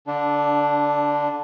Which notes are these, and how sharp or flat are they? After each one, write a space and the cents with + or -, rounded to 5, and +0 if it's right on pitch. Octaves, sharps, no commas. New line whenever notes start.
D3 -25 D4 +0